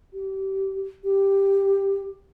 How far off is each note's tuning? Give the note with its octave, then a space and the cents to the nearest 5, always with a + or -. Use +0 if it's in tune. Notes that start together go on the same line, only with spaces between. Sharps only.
G4 -25
G4 +5